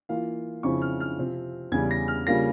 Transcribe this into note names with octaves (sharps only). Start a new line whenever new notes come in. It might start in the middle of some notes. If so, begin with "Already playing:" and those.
E3 A#3 F4 F5
F2 C#3 F3 C4 E4 C#6
F6
F6
C3 F3 C4
E2 C#3 G3 G#6
A#6
F6
C#3 G3 A#3 F4 A#6